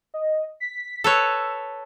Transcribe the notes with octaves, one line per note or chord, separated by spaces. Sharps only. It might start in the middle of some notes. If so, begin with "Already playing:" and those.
D#5
B6
A4 B4 C#5 E6